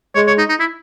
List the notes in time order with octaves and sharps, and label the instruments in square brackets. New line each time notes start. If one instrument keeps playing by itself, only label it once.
[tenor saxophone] G#3 [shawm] C#5
[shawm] C#5
D#4
D#4
E4